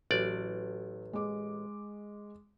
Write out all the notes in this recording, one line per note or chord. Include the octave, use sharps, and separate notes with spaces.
A1 F#3 D5
G#3 D6